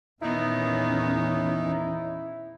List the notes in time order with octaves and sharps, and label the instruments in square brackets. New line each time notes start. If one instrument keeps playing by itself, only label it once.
[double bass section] E2 E3 C#4 [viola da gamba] A#2 D#3 B3 [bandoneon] D#4 [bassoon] E4